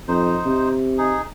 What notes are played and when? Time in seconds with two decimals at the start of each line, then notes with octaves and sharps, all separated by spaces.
0.08 F2 D#4 C5
0.46 C3
0.98 D#4 G#4